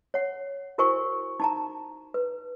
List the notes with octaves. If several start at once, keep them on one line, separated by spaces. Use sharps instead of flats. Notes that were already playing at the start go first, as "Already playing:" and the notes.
C#5 F#5
E4 F#4 A#4 C5 G#5 C#6
D#4 A5 A#5
B4